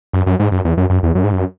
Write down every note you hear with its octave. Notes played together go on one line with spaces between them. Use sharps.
F#2
F#2
G#2
F#2
E2
F#2
F#2
E2
F#2
G#2
F#2